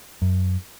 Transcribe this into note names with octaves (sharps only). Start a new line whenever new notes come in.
F#2